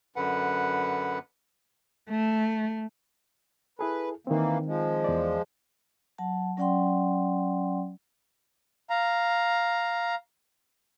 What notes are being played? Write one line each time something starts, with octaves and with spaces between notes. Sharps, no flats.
F#2 D3 B4 F#5
A3
E4 G#4 A4 B4
D#3 E3 A#3 C4
F3 G#3
E2 D5
F#3 F#5 A5
F#3 C#4 D5 F#5 G5 C6
F5 A#5